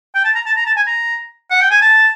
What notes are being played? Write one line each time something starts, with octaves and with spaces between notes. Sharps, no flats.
G5
A5
A#5
A5
A#5
A5
G#5
A#5
F#5
G5
G#5
A5